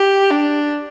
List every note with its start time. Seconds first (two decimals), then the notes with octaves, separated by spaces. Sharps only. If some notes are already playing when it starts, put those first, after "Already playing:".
Already playing: G4
0.30 D4